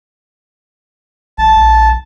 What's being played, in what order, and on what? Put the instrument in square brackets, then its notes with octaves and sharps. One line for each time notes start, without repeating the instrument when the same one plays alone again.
[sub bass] A1 [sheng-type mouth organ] A5
[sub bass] A#1